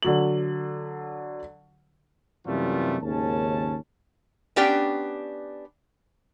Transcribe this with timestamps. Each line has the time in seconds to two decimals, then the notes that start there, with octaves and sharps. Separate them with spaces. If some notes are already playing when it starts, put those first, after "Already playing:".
0.03 D3 F#3 F#7
2.46 F#2 C3 E3 G3 A3 F4
3.01 G#1 D#2 C#3 C#4 A5
4.56 B3 C#4 D4 G4 D5 G5